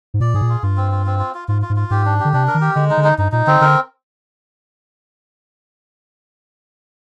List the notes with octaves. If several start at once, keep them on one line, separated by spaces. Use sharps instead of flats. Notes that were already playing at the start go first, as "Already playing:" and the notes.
G#2
A#2 D5
G#2 G#4
A#2
F4
G2 F4
C4
F4
C4
F4
F4
G#2 F4
F4
G#2
F4
G#2 G4
D4
G4
D3
C3 D4
A#4
D#3
G4
D3 G#3
D#4
D3
D#4
G2 D#4
A#2 D#4
D3 C4
D3 A#4